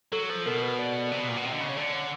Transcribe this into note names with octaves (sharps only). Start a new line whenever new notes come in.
F#3 A4
F3 A4
B2 A#4
B4
D5
C3
B2
A#2
B2
C3 D#5
D3
C#3
C#5
D3 D5
C#5